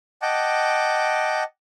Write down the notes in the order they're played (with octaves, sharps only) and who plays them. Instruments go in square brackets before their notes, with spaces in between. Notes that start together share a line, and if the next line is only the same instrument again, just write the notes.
[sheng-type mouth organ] D#5 F#5 G5 A5 D6